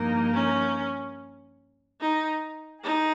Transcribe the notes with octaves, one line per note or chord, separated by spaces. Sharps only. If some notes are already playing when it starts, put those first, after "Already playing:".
Already playing: G2 F3 A#3 D#4 A#4
C#4
D#4
D#4 G#4